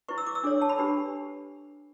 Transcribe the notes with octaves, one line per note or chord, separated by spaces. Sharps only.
E4 B4 C#6
E6
D6
E6
D4 A4 C#5 D6
A5
B5
D4 G4 B4